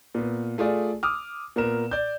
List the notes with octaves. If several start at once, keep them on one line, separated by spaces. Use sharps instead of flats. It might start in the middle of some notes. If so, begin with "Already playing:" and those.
A#2 B3
A3 F4 G#4 D5
D6 D#6 F6
A#2 B3 A#4 E7
D5 G6